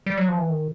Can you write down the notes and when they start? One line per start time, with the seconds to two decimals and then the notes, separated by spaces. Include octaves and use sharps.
0.06 G3
0.17 F#3
0.28 F3
0.38 E3
0.49 D#3